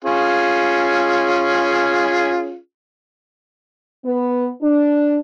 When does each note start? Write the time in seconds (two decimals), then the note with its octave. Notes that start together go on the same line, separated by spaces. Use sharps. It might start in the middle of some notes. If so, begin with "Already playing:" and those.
0.05 C#4 F4 G#4
4.05 B3
4.62 D4